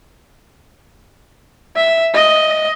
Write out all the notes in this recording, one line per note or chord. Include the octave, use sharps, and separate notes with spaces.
E5
D#5